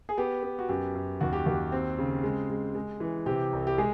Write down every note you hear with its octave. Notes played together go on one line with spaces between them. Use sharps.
G#4
B3 G4
B3
F#4
F#2 G4
F#2
D#2 F#4
G4
D#2 F#4
C4
C#3
G#3
G#3
G#3
E3
C3 G4
C2
G4
G#3 G#4